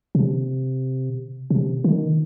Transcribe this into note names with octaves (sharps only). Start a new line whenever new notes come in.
C3
C3
D#3